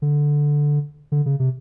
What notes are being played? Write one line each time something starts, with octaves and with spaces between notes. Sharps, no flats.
D3
D3
C#3
C3